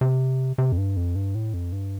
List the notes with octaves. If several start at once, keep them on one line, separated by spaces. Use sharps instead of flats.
C3
C3
F2
G2
F2
G2
A2
F2
G2